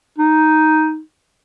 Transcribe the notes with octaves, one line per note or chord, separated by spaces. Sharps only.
D#4